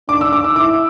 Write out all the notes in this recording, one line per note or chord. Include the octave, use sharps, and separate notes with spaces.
D4 D6
E6
D6
E6
E4 D6